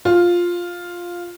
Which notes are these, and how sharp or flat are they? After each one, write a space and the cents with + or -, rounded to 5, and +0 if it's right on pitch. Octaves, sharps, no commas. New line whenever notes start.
F4 +5